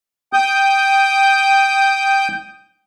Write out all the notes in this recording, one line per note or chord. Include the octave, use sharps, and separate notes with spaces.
G5 D#6 G6